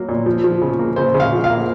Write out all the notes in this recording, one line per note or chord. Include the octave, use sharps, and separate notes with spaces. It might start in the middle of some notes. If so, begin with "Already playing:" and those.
Already playing: F#3 A#3
A#2
F3
F3
C#3
A#3
C#3 C5
C#3
F5
F3
F5
A#3